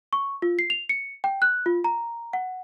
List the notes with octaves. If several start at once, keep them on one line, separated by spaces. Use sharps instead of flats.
C#6
F4
C7
F7
C#7
G5
F#6
F4
A#5
F#5